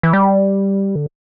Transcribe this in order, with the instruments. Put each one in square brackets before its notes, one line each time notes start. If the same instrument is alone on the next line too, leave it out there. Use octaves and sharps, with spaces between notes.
[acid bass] E3
G3
D3